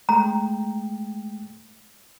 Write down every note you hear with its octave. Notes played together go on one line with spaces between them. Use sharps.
G#3 A3 G5 A#5